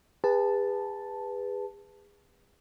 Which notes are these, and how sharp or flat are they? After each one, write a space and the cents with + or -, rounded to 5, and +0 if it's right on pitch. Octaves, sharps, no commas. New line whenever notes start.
G#4 -35 B4 +0 A5 +0